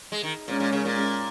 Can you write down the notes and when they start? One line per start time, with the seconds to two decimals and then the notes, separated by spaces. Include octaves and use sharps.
0.12 G#3
0.23 D#3
0.48 A#2 G#3 C#4 A#4
0.60 A#2
0.72 C#3
0.85 A#2